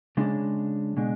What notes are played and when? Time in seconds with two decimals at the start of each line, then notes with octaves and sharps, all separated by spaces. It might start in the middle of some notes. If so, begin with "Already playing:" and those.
0.17 C#3 G#3 D4
0.97 B2 G#3 D4